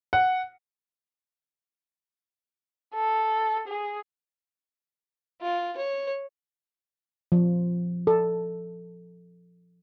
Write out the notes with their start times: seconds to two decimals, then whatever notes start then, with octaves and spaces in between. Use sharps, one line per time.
0.13 F#5
2.95 A4
3.68 G#4
5.41 F4
5.76 C#5
7.32 F3
8.07 A4